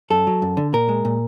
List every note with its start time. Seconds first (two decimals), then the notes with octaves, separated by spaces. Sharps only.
0.10 F#2 A4
0.27 F#3
0.42 F#2
0.57 D3
0.73 A#2 A#4
0.89 G#3
1.05 A#2